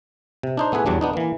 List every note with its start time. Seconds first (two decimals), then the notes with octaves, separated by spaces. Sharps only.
0.43 C3
0.57 D4 D#4 C5
0.72 A3 B3 E4 G#4 B4
0.86 E2 F#3 G3 D4
1.01 B3 D4 D#4
1.13 E3 A#3